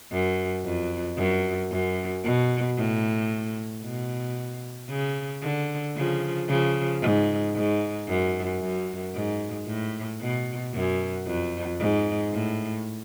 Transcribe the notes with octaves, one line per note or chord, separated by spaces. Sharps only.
F#2
F2
F#2
F#2
B2
A2
B2
C#3
D3
C#3 F3
C#3 F3
G#2
G#2
F#2
F#2
G#2
A2
B2
F#2
F2
G#2
A2